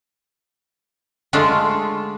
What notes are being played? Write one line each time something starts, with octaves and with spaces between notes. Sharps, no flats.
D3 G#3 A3 D4 F4 A4